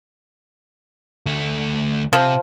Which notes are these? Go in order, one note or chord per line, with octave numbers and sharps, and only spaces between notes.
D2 A3
C3 F3